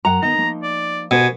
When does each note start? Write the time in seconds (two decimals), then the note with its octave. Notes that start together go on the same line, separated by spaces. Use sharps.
0.05 F#2 F#3 F#5 G5 A#5
0.22 D#3 B3 D#4 A#5
0.38 F3 A#3
0.63 D5
1.11 B2 G4 A#4 C5 G#5